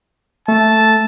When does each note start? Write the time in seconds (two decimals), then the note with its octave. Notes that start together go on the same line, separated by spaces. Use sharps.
0.48 A3 A5